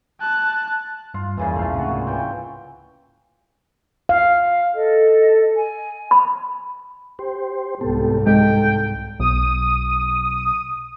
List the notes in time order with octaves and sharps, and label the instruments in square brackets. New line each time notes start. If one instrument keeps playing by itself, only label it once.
[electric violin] A5 F#6
[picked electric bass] G2 [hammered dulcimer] F4
[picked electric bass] E2 G2 [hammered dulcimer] A#2 C#3 E3
[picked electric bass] B1 F2 [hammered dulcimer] A3 F5
[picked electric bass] C#2 G#2 C3 [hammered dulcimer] F4 F#4
[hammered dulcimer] A#2
E3 G5
[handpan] F5
[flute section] A4 D#5
G#5
[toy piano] B5
[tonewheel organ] G4 C5
[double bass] C2 G#2 [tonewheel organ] B3 G4 A4
[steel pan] G#3 [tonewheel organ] A4 [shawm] G5
[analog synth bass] B1 [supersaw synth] D#6